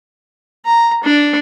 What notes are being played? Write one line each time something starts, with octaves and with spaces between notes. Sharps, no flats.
A#5
D4